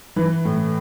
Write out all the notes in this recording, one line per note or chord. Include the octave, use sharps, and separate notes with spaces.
E3 B4
A2